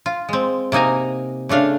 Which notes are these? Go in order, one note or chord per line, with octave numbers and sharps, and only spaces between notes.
F4
G#3 C4
C3 A#3 D#4 G#5 A#5
C#3 A3 D4 F5